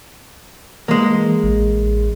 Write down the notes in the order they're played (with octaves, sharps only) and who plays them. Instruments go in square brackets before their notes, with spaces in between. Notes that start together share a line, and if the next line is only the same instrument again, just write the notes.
[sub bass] E3 [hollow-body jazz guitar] G#3 A#3
[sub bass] A1